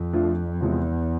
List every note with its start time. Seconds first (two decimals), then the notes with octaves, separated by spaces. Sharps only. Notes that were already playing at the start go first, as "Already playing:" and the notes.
Already playing: F2
0.13 F3 A3 D4 F4
0.61 E2 C3 F3 G#3